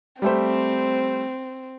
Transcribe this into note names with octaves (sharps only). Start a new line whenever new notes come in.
G3 A3 C4 C5